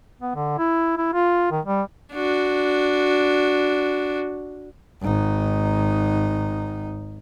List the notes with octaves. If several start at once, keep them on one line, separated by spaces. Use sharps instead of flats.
B3
D3
E4
E4
F4
D#3
G3
D4 F#4
G#1 D#4